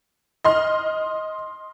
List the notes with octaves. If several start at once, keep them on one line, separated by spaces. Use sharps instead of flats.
D#5 C6 F6